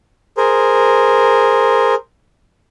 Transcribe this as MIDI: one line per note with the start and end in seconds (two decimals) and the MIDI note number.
0.37 1.94 68
0.37 1.94 70
0.37 1.94 72